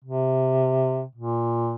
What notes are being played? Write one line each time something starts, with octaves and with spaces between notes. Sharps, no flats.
C3
A#2